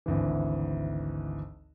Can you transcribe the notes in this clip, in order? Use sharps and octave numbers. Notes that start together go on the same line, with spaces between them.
G#1 D2 E3